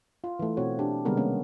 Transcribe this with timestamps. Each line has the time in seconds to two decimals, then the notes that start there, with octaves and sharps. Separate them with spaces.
0.24 F4
0.39 E3 A3
0.57 B2 C4 F#4 C#5
0.79 D4 G4
1.05 C3 D#3 G3 G#3 B3 A#4
1.17 A#3 C#4